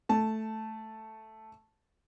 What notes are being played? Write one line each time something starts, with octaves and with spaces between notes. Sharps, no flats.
A3 A5